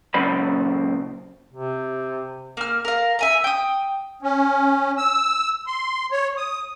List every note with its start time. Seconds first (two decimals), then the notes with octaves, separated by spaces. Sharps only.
0.14 A#2 C#3 F#3 C5 D5 B5
1.53 C3
2.57 A#3 F6
2.85 A#4 F5
3.19 E5 G#5 A#5
3.44 G5 D#6
4.22 C#4
4.98 E6
5.67 C6
6.12 C#5
6.37 D#6